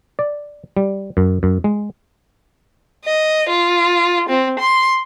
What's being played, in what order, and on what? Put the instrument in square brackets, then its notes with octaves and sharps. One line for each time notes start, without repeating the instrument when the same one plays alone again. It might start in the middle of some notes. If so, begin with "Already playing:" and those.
[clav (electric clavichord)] D5
G3
F#2
F#2
G#3
[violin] D#5
F4
C4
C6